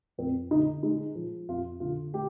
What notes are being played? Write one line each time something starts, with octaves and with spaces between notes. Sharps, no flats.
F2 C4
D3 D#4
G#3 D#4
F3
F2 F4
D3 F4
G#3 G4